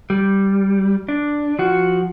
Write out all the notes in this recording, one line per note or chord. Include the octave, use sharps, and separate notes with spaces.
G3
D4
F3 F#4